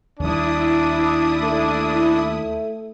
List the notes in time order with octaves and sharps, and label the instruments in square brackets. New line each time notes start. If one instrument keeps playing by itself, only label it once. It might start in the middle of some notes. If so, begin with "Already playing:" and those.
[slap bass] D#2 G3 [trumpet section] D4 [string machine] E4 D#6
[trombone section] A3